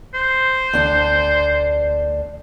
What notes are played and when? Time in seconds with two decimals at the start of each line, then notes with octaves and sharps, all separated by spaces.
0.15 C5
0.73 D2 D4